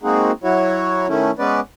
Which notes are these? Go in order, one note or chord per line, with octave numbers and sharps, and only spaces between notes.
G#3 A#3 C4 D#4 F#4 G#4
F#3 E4 F#4 C#5
D#3 A3 C#4 E4
G#3 B3 C#4 B4 D5